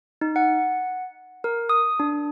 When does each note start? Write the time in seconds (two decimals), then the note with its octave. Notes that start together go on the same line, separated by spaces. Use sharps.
0.21 D#4
0.36 F#5
1.44 A#4
1.69 D#6
2.00 D4